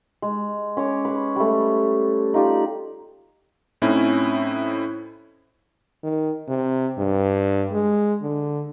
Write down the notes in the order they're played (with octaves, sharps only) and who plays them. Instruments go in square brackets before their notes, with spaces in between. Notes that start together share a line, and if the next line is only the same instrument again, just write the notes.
[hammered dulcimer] G#3
C#4 C#5 D6
G#4 B4
G3 A3
D#4 F4 G4 D5
[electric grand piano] A2 C4 C#4 D#4 E4
[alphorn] D#3
C3
G2
G#3
D3